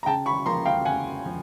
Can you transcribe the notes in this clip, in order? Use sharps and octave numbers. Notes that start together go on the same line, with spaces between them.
A#5
C#3 G5 A5
B5 C#6
F3 A#3 A#5 C6
F5 G5
C#3 F#5 G#5
F3